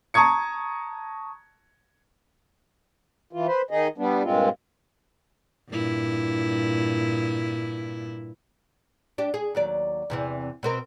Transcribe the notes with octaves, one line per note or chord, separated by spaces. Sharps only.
A5 A#5 C#6 D#6 G#6 C#7
E3 F4
B4 C5
D#3 D#4 G#4 D#5
G3 B3 D4
G2 A#2 G#3 C4 F4
G2 A#2 E4
D4 G4
G#4
D#2 F#3 D5
E2 C3 E3
B2 C4 A#4